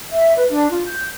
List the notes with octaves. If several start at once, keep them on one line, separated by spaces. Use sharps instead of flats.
E5
B4
D4
F4
G6